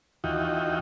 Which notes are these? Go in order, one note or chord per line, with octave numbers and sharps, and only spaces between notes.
D#2 E3 D#4 F4 F#4 G5